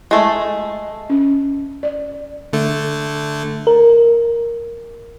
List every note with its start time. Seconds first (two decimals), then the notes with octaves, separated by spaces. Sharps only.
0.11 G#3 A3
1.10 C#4
1.83 D5
2.53 D3 A3
3.67 A#4